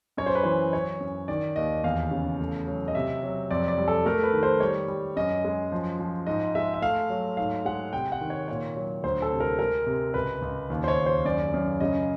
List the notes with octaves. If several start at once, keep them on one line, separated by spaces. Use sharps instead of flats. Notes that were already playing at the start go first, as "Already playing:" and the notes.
F#2 C#5
C5
B4
E3 C5
F#3 C#5
F#2
D#3 D5
D#2 D#5
E2 F5
C#3
A3
F#3
D#5
C3 E5
F#3
F2 D5
D5
G3
A4
A3 A#4
B4
D#3
C5
G3 C#5
G3
F#2 D#5
G#3
F3
F3
G#2 D#5
G#3 E5
E5
A3 F5
F#3
G#2 F5
G#3 F#5
C3 G5
F#5
D#3
C#5
A#2 C#5
F#3
D2 C5
A4
C3
A#4
G#3 A#4
C3
C#2 B4
C#2
D#2
C5
C#5
D#2
C5
F#2 D5
F#2
C#3 D#5